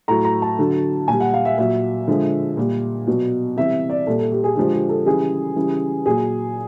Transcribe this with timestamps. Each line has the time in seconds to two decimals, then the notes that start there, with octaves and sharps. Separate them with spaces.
0.08 A2 F#3 A#5
0.25 A#5
0.42 A5
0.59 D3 F#3
1.08 A#2 G#5
1.13 G3
1.20 F#5
1.34 F5
1.45 E5
1.58 A#2 F#3 E5
2.07 D3 F3 G#3
2.57 A#2 G3
3.07 B2 F#3
3.56 C3 E3 G3 E5
3.90 D5
4.07 A#2 G3 A4
4.19 A4
4.32 G4
4.44 G#4
4.56 D3 F3 G#3 G4
4.73 G4
4.89 A4
5.06 C#3 E3 G3 G#4
5.56 C#3 E3 G3
6.06 A#2 F#3 G#4